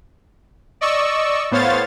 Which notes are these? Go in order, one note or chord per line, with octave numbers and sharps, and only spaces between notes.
D5 D#5 C#6 E6
A2 B3 C5 C#5 F5 A6